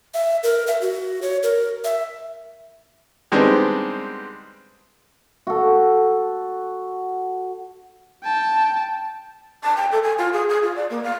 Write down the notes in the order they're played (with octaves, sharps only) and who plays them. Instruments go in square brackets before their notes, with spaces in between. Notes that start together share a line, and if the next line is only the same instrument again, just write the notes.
[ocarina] E5
A#4
E5
F#4
C#5
A#4
E5
[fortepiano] D#3 G3 G#3 B3 C4 D4
[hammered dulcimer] F#4 A4
[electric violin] G5 A5
[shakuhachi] A5
G5
A4
G#5
F4
G#4
G#4
F4
D5
A#3
F5